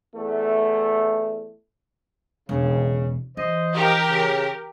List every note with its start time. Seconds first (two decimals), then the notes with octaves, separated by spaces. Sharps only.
0.15 E2 A3
2.49 E1 C#3
3.37 E3 C5 D#5
3.75 F3 D#4 G4 A#4
4.08 C#3